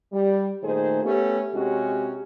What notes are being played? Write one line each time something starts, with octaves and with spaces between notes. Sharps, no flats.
G3
A#2 D#3 A3 G#4 C5
A3 B3 C#4 G4
C3 G#3 C#4 F#4 G4